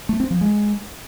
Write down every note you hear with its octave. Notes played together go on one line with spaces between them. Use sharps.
A3
C4
F3
G#3